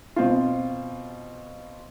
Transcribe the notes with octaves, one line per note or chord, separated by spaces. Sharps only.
B2 C4 F4